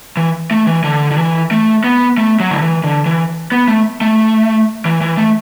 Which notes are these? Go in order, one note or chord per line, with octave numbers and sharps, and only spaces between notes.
E3
A3
E3
D3
D3
E3
A3
B3
A3
F#3
D3
E3
D3
E3
B3
A3
A3
E3
E3
A3